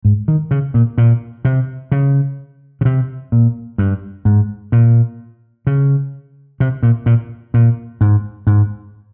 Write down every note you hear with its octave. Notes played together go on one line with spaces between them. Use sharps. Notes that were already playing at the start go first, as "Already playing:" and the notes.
G#2
D#3
C#3
A#2
A#2
C3
C#3
C#3
C3
A#2
G2
G#2
A#2
C#3
C3
A#2
A#2
A#2
G#2
G#2